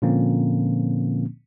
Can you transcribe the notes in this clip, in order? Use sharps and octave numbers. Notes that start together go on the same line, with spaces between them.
A#2 D3 F3 A#3 C4 C#4